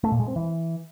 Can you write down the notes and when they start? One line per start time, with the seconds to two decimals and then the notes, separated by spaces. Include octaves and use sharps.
0.04 A3
0.12 A#2
0.20 G#3
0.28 C4
0.36 E3